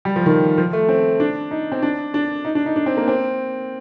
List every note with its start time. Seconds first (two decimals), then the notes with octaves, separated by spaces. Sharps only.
0.05 G3
0.16 F3
0.26 D#3
0.58 F3
0.73 A3
0.89 C4
1.20 D4
1.51 D#4
1.72 C4
1.83 D4
2.14 D4
2.45 D#4
2.55 D4
2.66 D#4
2.76 D4
2.86 C4
2.97 A#3
3.08 C4